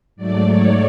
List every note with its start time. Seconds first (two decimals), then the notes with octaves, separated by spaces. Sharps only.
0.16 G#2 F#3 A3 D5
0.47 C#5